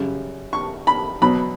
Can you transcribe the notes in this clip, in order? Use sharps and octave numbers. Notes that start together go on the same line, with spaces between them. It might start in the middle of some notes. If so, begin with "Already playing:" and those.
Already playing: F#2 C#3 G3
C#6
B5
B2 F#3 B3 B5